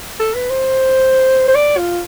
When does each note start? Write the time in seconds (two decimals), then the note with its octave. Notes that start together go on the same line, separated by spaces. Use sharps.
0.20 A4
0.34 B4
0.50 C5
1.48 C5
1.55 D5
1.77 F4